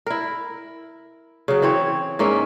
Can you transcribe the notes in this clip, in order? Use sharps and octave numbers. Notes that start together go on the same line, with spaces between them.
E4 A#4
C#3 F#3
E3 C4 C#5
G#2 A#3 C#4 E5